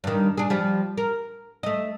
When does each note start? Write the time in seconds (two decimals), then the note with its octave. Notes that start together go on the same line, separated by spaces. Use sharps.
0.04 G2 D#3
0.37 D4 G#4
0.50 F3 G3
0.97 A#4
1.63 A3 D#5